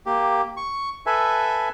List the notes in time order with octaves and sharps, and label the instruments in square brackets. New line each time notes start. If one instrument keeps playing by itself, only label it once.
[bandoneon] A#3 G4
C#6
A4 B4 E5 G#5